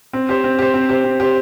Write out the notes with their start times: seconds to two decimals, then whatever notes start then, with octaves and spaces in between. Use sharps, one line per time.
0.13 C4
0.29 G4 C5
0.44 C4
0.59 G4 C5
0.74 C4
0.89 G4 C5
1.04 C4
1.20 G4 C5